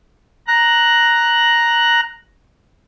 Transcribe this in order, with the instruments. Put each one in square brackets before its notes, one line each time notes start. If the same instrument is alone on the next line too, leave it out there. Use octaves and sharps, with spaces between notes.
[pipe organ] A#5 F#6